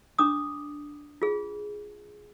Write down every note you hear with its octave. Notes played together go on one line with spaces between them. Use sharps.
D4 D6 D#6
F4 G#4